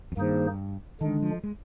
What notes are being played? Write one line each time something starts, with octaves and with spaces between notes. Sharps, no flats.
F2
G2 D#3 A#3 D#4 G#4 C5
D3 D#3 G#3 D4
F3
G#3